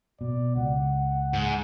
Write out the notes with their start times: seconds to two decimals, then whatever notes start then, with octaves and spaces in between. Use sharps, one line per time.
0.21 B2 D5
0.56 C#2 F#5
1.33 G#2